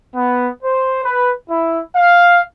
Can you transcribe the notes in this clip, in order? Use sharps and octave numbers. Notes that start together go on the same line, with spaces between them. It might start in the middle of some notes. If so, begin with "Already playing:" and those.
B3
C5
B4
E4
F5